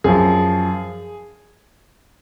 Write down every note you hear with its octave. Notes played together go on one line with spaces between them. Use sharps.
F#2 F3 G#4